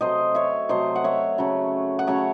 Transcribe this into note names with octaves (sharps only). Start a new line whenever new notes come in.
C3 F#3 A3 C5 D#5
C#5 E5
C3 F#3 A3 C5 D#5
F#5
C#5 E5
C#3 F#3 A3
F#5
C#3 F#3 A3 C#5 E5